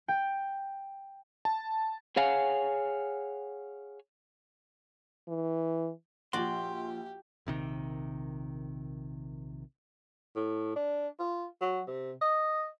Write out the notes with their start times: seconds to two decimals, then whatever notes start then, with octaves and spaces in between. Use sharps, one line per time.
0.08 G5
1.45 A5
2.16 G#4 C#5 F5 F#5 G#5
5.28 E3
6.33 A#1 F3 F#4 G4 D5 C6
7.46 A#1 C3 D#3
10.36 A2
10.76 D4
11.19 F4
11.61 F#3
11.87 C3
12.22 D#5